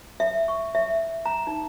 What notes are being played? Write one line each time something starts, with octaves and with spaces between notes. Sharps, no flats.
E5
C#6
E5
A#5
D#4